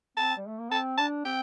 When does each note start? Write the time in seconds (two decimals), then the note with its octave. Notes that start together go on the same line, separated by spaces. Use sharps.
0.17 C4 A5
0.37 G3
0.48 A3
0.60 A#3
0.71 C4 A5
0.98 D4 A5
1.25 C4 G5